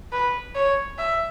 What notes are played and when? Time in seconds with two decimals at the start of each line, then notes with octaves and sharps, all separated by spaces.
0.12 B4
0.55 C#5
0.98 E5